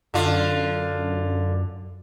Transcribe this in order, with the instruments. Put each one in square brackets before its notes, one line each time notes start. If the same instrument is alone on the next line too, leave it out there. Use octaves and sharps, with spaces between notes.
[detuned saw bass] F#2 [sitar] D3 F4